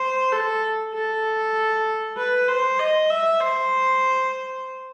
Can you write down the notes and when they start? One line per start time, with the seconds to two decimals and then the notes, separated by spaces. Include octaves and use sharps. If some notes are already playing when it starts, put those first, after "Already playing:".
Already playing: C5
0.33 A4
0.94 A4
2.18 B4
2.49 C5
2.79 D#5
3.10 E5
3.41 C5